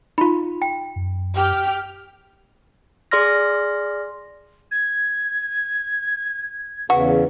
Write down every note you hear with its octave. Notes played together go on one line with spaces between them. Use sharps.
D#4 F4 B5
G5
F#2
G4 F6
G#4 D5 C6 F6 A#6
G#6
E2 C#3 F#4 B4